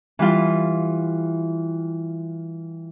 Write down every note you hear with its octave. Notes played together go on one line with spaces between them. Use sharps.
E3 G3 F4